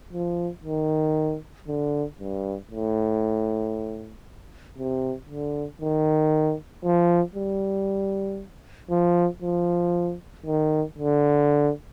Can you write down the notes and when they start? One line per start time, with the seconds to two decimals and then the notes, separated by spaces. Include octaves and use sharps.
0.13 F3
0.64 D#3
1.68 D3
2.20 G2
2.71 A2
4.78 C3
5.29 D3
5.82 D#3
6.85 F3
7.36 G3
8.91 F3
9.42 F3
10.46 D#3
10.99 D3